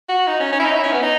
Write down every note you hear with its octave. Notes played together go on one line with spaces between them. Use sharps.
F#4
D#4
C#4
C#4
E4
D#4
E4
C#4
B3
D#4